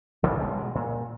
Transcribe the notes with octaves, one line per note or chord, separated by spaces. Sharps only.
G1 C#3 F3 G3
B1 G3 G#3
B2 G#3
A#2